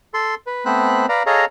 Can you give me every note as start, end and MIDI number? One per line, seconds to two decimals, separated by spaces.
0.14 0.35 69
0.14 0.35 84
0.47 0.65 71
0.65 1.06 57
0.65 1.06 59
0.65 1.06 60
0.65 1.06 72
0.65 1.06 83
0.65 1.06 90
1.09 1.23 71
1.09 1.23 74
1.09 1.23 77
1.09 1.23 82
1.26 1.45 68
1.26 1.45 69
1.26 1.45 73
1.26 1.45 75
1.26 1.45 77
1.26 1.45 82